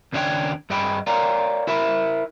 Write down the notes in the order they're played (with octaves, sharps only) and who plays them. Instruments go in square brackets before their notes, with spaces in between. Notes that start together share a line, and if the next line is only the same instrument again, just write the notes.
[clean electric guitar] D#2 C#3 D4 D#4 C#5 G5
G2 G#4 D#5 G5 B5
A#4 C#5 D5 F5 G5 A#5
E4 A#4 E5 B5